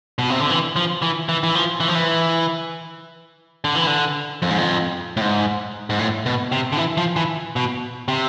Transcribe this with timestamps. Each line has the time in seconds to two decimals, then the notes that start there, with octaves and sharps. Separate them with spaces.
0.19 B2
0.30 C3
0.40 D3
0.50 E3
0.76 F3
1.02 E3
1.29 E3
1.43 E3
1.55 F3
1.80 E3
1.88 F3
1.95 E3
3.64 D3
3.75 E3
3.87 D3
4.42 F2
4.50 G#2
4.58 F2
5.17 A2
5.21 G#2
5.90 G#2
5.99 A2
6.26 B2
6.52 C3
6.72 D3
6.77 E3
6.97 F3
7.16 E3
7.56 B2
8.08 C3